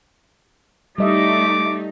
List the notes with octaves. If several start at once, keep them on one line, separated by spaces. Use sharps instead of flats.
G3 A3 D#4 D#5 E5 D6